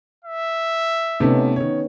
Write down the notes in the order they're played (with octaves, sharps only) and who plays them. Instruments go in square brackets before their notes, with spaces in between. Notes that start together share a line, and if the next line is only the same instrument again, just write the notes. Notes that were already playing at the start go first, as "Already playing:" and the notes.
[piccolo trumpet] E5
[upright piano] C3 A3 [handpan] B3 C#4 D#4
[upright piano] D#3 C#5